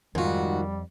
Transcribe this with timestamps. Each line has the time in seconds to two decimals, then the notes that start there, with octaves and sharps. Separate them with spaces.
0.15 F2 G#2 D#3 G3 F4 F#4